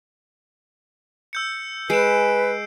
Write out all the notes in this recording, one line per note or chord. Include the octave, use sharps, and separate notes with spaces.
E6 G6 C#7
G#3 B4 C7 D7 E7